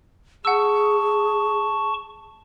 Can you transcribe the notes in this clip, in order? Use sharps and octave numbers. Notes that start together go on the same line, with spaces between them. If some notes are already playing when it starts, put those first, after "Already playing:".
G#4 F#5 A5 C#6 E6